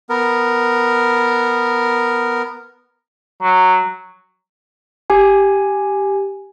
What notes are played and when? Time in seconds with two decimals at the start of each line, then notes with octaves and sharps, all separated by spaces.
0.09 B3 A#4
3.43 F#3
5.10 G4 G#5